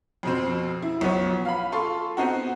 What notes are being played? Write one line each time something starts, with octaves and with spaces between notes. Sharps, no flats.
F2 B2 C4
E4
B1 F3 B3 C#5
F5 B5
F4 A4 C6 C#6
B3 C4 D#4 F#4